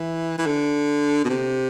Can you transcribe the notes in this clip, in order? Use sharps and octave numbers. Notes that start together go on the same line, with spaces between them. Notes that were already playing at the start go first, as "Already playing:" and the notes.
Already playing: E3
E3
D3
B2
C3